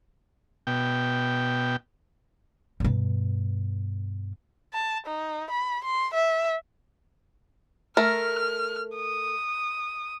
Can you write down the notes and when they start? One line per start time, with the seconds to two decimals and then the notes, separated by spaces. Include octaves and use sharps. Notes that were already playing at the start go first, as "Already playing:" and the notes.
0.67 B2 G5
2.80 G2 B2
4.73 A5
5.07 D#4
5.51 B5
5.85 C6
6.14 E5
7.97 A3 A#4 F6
8.95 D#6